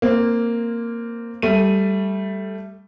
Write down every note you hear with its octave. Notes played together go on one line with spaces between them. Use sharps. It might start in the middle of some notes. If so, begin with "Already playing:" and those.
A#3 C4
G3 A3 D#7